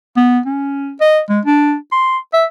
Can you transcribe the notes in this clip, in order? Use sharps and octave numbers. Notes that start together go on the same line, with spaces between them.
B3
C#4
D#5
G#3
D4
C6
E5